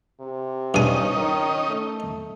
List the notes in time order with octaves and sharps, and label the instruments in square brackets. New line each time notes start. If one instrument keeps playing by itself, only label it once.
[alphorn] C3
[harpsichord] G2 G#5 [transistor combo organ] C#4 D#4 D#5
[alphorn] D#3
A3